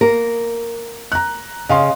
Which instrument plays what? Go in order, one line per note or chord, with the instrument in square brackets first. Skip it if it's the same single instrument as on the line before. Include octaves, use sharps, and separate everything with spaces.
[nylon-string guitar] A#3 A#4
[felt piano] A#5 F#6
[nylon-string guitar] C#3 [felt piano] D#5 F5 C6